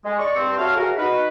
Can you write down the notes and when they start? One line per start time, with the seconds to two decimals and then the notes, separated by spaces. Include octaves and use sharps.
0.04 G#3
0.19 D5 C#6
0.36 G2 C4
0.57 F#4 A4 C#5 E5 F5
0.76 F#4 G#4 A#4
0.97 D#4 F#4 B4